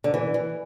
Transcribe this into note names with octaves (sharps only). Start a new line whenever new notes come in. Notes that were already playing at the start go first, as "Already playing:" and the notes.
D3
E3
E3